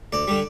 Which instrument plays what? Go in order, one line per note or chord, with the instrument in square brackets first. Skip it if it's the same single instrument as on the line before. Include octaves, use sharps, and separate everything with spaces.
[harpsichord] D2 D5
D3 G3